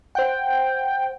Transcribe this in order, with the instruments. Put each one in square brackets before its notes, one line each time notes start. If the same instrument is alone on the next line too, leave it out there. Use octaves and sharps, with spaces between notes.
[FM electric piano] C5 F#5 [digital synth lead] G5